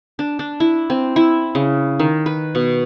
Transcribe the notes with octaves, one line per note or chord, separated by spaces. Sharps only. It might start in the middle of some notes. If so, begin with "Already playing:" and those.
D4
D4
E4
C4
E4
C#3
D#3
B4
B2